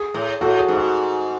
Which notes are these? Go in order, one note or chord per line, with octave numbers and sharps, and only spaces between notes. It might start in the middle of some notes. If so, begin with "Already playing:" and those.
Already playing: G#4
A2
A2 F#4 A4
G#4
G#2
F#4